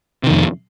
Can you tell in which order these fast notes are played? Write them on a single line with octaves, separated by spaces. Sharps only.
C3 D#3 F2